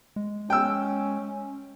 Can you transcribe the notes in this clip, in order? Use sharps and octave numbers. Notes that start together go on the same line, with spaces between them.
G#3
C#4 G5 E6